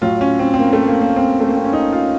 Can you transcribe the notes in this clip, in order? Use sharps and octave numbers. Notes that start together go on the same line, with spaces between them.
A2 F#3 F4
C#4
C4
C4
A#3
A3
A#3
A#3
C4
A3
A#3
C4
C#4
D#4
F4